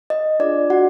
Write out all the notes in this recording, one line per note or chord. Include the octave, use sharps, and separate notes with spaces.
D#5
D4 F4 G#4 D5
F#4 F#5